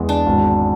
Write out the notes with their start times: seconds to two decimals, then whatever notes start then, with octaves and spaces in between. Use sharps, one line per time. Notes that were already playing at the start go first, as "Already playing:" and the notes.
Already playing: E2 G#3
0.09 D4
0.26 G#1